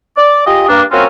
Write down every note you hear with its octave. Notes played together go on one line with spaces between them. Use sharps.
D5
F4 G4 G#4 D#5
G2 A#3 D4
F#3 A#3 C4 C#4 F4 F#4